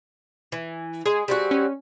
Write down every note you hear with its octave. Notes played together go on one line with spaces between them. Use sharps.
E3
G#3 G#4
G3 C4 F#4
C#4